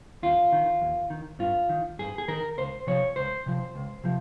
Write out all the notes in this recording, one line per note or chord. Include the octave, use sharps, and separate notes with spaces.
D#2 F4
D#3
D#2
D#3
G2 F4
D#3
G2 G#4
G#4
D#3 A#4
C#2 C5
C3 F3 C#5
C#2 C5
C3 F3
C#2
C3 F3